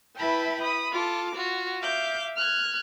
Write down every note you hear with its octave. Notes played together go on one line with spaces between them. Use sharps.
E4 B4 E5 G5 A5 B5
B5 D#6
F4 A4 D6
F4 F#4
E5 F5 D6 G6
F6 F#6 G#6